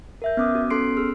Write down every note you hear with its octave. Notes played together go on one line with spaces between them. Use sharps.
A#4 E5 G6
B3 C#4 D6 D#6
F#4
B3 C#4 A4 C6 C7 D7
G#4 E6 F6